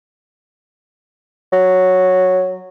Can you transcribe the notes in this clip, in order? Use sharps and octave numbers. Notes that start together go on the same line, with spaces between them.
F#3